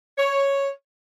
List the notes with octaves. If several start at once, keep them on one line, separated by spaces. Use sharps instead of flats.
C#5